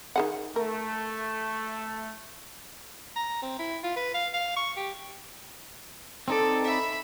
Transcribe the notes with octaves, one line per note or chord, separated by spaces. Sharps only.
D#3 G#4 F#5
A3 A#4
A#5
C4
E4
F4
B4
F5
F5
C#6
G4
C4 D#4 A4 D5
E5 B5